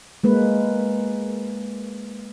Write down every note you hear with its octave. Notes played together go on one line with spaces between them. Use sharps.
G#3 A#3 B4